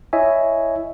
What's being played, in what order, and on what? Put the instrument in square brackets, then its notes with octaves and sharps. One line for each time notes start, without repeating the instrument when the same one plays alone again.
[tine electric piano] E4 C#5 D#5 E5 G#5